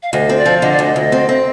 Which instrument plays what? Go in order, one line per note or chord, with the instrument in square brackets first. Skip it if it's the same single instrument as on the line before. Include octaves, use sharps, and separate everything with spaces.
[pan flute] F5
[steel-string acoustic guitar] D2 [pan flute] D#5
[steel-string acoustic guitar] C4
[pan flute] D5
[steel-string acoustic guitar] F3
[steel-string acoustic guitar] D3 [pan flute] D#5
[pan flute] D5
[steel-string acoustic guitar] D2 [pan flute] D#5
[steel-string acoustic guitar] D2
C4
C4